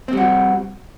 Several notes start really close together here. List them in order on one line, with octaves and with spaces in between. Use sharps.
C4 G3 F#4